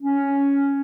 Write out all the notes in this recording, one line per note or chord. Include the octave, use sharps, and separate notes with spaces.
C#4